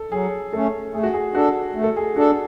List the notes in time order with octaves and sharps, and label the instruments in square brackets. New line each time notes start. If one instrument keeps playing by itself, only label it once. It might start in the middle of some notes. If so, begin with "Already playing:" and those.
Already playing: [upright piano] A4
[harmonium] F#3 [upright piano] G#4
[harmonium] A3 C#4 [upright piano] A4
[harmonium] A3 [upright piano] G#4
[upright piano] F#4
G#4
[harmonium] D4 A4 [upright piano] F#4
[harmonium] A3
[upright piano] A4
G#4
[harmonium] D4 A4 [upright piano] F#4